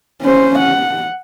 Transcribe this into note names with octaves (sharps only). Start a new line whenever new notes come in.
C#4 C5
F#5